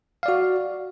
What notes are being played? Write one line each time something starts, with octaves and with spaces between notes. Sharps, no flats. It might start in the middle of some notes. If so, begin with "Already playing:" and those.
F#4 D5 F5